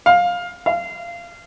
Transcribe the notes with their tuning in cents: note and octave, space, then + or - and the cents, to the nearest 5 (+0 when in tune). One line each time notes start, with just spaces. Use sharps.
F5 +15
F5 -20